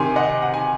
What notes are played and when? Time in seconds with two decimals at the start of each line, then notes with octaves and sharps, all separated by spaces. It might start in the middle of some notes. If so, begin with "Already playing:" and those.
Already playing: C3 D#3 G#5 C6
0.16 D#5 F#5
0.42 F#5
0.54 G#5